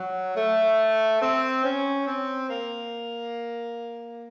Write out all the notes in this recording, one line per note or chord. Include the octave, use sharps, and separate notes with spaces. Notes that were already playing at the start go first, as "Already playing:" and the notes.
Already playing: F#3
A3
C4
C#4
C4
A#3